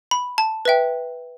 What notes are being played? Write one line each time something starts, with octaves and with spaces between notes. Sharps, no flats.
B5
A5
B4 E5 G5